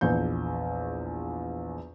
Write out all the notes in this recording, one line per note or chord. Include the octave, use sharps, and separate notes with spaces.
A#1 E2 G6